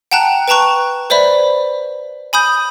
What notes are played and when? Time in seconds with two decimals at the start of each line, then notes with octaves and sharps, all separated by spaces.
0.11 F#5 G5 A5 A#5 F#6
0.48 B4 G5 A5 A#5 C#6 F#6
1.10 B4 C5 D5 E5 B5
2.33 G#5 B5 D#6 G6